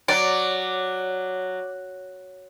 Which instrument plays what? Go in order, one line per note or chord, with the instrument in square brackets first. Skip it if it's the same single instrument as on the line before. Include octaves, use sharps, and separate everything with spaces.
[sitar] F#3 [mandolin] D5